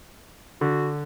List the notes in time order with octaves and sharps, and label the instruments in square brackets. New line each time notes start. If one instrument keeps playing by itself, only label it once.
[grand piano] D3 [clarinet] F#4